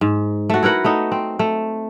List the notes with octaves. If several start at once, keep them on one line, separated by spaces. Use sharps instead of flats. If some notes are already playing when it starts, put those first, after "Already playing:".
G#2
A3 F#4
E4 A#4 B4 F#5
A3 B3 D#4
C4
A3